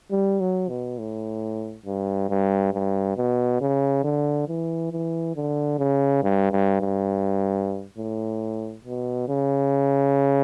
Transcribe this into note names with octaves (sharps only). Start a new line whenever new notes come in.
G3
F#3
B2
A2
G2
G2
G2
B2
C#3
D3
E3
E3
D3
C#3
G2
G2
G2
A2
B2
C#3